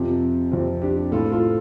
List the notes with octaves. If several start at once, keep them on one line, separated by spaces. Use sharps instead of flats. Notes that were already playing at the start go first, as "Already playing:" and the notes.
Already playing: F2 C3 F3
F2 C3 F3 C4
D4 G4
A2 F3 F4 A4
F4 A4